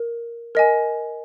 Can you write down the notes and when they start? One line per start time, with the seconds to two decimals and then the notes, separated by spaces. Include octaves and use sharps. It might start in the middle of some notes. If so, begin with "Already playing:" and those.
Already playing: A#4
0.55 A#4 D#5 G#5